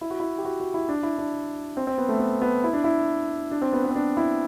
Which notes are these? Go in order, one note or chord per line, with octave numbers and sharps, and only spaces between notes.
E4
F#4
E4
G4
F#4
F#4
E4
D4
E4
D4
C4
C4
B3
A3
B3
B3
E4
D4
E4
D4
C4
B3
B3
C4
D4
E4